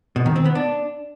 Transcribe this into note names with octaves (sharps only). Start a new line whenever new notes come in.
B2
D#3
C4
B3
D4